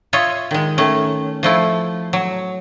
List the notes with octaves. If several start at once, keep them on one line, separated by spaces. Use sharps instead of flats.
F4 C#5 D#5 E5
D#3 G#3
D#3 A3 C#4
F3 A3 E4
F#3